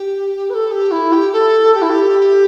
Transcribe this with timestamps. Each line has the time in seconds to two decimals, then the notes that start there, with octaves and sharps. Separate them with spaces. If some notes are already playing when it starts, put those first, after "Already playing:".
Already playing: G4
0.50 B4
0.54 A4
0.71 G4
0.91 E4
1.12 G4
1.32 A4
1.74 G4
1.82 E4
1.90 G4